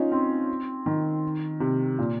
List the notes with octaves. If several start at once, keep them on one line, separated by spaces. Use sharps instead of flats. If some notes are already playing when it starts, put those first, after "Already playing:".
Already playing: C#4 D#4 F4
C4
D#3
C3
A#2